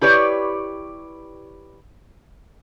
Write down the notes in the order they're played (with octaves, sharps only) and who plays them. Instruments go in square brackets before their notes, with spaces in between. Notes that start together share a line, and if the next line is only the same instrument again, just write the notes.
[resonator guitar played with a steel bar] E4 G4 B4 C#5 D5